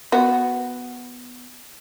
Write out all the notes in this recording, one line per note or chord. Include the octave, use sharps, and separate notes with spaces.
B3 F#4